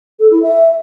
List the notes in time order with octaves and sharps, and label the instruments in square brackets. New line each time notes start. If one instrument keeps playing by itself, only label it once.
[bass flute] A4
E4
E5